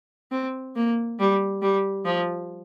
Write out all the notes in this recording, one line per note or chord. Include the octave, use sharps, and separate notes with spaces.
C4
A#3
G3
G3
F3